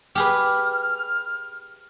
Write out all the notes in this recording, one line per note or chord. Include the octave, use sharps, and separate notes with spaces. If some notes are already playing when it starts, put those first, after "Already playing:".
G4 G#4 B4 F6